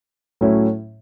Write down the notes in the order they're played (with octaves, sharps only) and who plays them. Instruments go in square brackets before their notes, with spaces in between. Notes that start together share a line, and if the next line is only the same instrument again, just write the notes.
[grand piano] A2 F#3 A3 C#4 E4